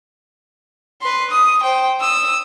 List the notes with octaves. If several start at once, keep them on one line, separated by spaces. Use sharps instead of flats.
B4 C6
D#6
C5 G5
D#6 E6